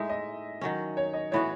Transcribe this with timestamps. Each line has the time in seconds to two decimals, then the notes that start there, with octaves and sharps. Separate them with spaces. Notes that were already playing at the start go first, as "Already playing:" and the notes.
Already playing: A2 G#3 D#4 E5
0.09 D#5
0.61 D#3 F#3 C#4
0.97 C#5
1.13 D#5
1.31 A2 E3 B3 F#4 C#5